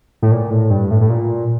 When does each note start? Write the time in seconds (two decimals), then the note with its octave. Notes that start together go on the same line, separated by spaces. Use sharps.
0.23 A2
0.31 A#2
0.51 A2
0.70 G2
0.91 A2
1.01 A2
1.10 A#2